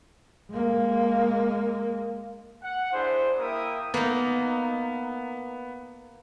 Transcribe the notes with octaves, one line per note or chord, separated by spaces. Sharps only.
G#3 A#3
F#5
D4 E4 G#4 C5
A#3 E4 A#4 E5 G5 D#6
A#3 B3 D#4